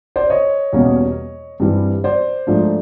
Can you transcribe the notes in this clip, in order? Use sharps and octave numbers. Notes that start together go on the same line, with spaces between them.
C5 D5
C#5 D#5
E2 B2 G3 A#3 C#4
G2 E3 G3 C4
C5 D5
G#2 F3 A3 D4